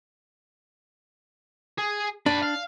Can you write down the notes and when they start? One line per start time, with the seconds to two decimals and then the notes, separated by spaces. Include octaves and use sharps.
1.79 G#4
2.26 D4 B4 D5
2.43 F5